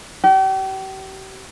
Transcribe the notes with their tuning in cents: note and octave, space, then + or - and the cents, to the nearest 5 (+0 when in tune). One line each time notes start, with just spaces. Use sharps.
G4 -40